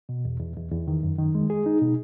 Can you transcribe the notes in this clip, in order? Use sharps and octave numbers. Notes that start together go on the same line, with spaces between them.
B2
E2
E2
E2
E2
D#3
F#2
D#3
G#3
G#4
D#4
B2